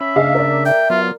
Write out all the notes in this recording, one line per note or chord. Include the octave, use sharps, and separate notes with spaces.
C#4 E5 B5
C#3 D4 G#4 D#5 F5
A#4 D5
E5 G5
F#3 B3 F4